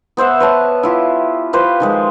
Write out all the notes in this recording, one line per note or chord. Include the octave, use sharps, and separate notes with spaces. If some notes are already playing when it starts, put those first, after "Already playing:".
B3 C5 E5 F#5
B4 C#5 A5
E4 F4 G4
F4 G4 B4 C5
D#3 F3 G#3